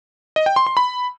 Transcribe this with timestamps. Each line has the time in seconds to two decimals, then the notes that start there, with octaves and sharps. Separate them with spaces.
0.36 D#5
0.46 G5
0.56 C6
0.67 C6
0.77 B5